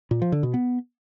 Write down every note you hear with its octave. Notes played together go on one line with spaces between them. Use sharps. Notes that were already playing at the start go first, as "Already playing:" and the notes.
A#2
F3
D3
B2
B3